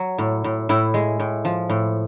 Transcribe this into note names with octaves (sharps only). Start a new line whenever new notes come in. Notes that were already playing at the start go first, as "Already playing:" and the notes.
Already playing: F#3
A2
A2
A2 E4
G#3
A2
F3
A2